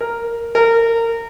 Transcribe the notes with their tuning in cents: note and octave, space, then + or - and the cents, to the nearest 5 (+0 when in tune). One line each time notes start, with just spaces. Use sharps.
A#4 -5
A#4 -25